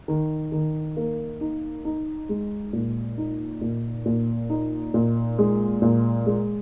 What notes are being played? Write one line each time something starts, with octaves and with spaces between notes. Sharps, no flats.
D#3
D#3
A#3
D#4
D#4
G#3
A#2
D#4
A#2
A#2
D#4
A#2
G#3
A#2
G#3